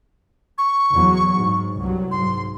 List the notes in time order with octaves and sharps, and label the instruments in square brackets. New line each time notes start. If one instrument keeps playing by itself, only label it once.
[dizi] C#6
[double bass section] E2 F#3
G#2
C2 G2 F#3
[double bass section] G#2 [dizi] C6